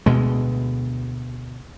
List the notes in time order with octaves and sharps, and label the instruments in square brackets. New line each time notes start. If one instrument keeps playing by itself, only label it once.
[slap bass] D2 B2 G#3